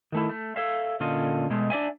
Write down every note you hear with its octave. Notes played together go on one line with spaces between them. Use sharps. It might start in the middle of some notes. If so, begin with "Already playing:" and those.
D#3 A3 E4
A3
A4 C#5 E5 F5
A#2 D3 C#4 F4 A4 D#5
B2 G#3 A3
D4 D5 E5 G#5